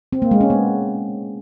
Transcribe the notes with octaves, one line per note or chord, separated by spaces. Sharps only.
C4
A#3
G#3
C#4
B3